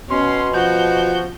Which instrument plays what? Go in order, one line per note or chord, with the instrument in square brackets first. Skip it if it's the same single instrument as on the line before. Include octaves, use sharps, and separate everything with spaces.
[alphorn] B2 [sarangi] C#4 [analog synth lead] C6
[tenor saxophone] F3 [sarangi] F#4 [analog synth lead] G6